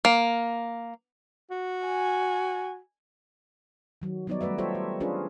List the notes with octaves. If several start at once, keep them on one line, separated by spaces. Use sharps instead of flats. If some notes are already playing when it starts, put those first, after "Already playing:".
A#3
F#4
G#5
D#3 F#3
F#3 G3 B3 D#4 C#5 D5
G3 A3 B4 D5 E5
F4 G4 A4 C5 C#5 E5
A4
C#4 D4 F4 G#4 B4